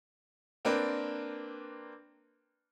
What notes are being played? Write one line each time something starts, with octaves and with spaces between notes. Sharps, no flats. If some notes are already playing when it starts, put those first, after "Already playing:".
A#3 C4 D4 A#4 B4 D5